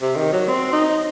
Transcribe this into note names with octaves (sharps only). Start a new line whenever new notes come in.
C3
D#3
F#3
C4
D#4